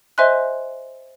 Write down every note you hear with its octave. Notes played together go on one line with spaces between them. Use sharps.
C5 D#5 E5 G#5 C6 F#6